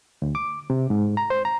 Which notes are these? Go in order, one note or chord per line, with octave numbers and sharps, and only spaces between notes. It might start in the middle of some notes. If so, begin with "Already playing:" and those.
D2
D6
C3
G#2
A#5
C5
A#5